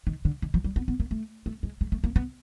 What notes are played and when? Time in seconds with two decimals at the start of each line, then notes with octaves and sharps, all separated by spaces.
0.07 D#3
0.25 D3
0.42 D#3
0.54 F3
0.64 G3
0.76 B3
0.88 B3
1.00 A#3
1.11 A3
1.46 A3
1.63 G#3
1.81 G#3
1.92 A3
2.04 A#3
2.16 B3